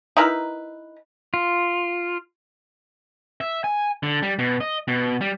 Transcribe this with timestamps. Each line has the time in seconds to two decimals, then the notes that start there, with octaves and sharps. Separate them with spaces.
0.17 D#4 E4 A#4 B4
1.34 F4
3.41 E5
3.64 G#5
4.03 D3
4.22 G3
4.39 B2
4.61 D#5
4.88 B2
5.21 G3